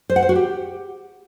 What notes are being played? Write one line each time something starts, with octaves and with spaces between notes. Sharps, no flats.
C5
F#5
C5
F#4
G4